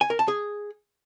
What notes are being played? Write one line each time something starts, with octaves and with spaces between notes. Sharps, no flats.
G#5
A#4
A5
G#4